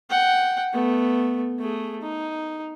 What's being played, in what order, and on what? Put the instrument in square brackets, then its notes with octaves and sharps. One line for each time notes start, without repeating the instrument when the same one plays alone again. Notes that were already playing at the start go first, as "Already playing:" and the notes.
[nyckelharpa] F#5 G5
A3 B3
A3 G#4
D#4